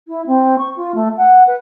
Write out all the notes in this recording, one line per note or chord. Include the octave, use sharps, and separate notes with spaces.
E4
C4
C#6
F4
A3
F#5
B4